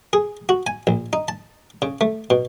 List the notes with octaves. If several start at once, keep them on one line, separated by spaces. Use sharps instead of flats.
G#4
F#4
G#5
A#1
D#4
A5
C#3
A3
B2